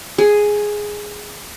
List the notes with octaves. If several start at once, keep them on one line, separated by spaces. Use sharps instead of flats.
G#4